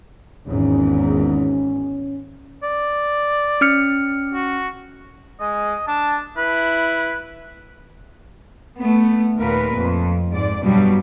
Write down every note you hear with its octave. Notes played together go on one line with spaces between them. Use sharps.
G#1 E2 G#2 C#4
D5
C#4 F6 C#7
F#4
G#3 D#5
D4 A5
E4 B4
A3 B3
D#2 A#2 A#4 B4
F2
G#2 D5
G2 B2 F#3 G3